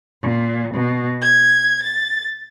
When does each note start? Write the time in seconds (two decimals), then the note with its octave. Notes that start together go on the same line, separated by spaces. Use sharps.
0.23 A#2
0.74 B2
1.21 G#6
1.83 A6